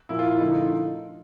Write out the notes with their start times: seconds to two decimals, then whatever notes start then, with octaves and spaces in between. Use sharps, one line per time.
0.09 A#2 F3 A#3 E4
0.19 F4
0.28 E4
0.37 D#4
0.41 D3 F3 A3 E4
0.52 D#4
0.62 F4